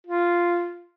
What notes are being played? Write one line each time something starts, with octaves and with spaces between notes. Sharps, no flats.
F4